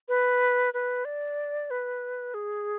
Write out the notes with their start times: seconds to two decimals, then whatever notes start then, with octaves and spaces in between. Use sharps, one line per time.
0.09 B4
0.74 B4
1.05 D5
1.71 B4
2.34 G#4